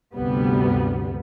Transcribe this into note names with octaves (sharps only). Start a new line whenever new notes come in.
D2 G2 C3 G3 B3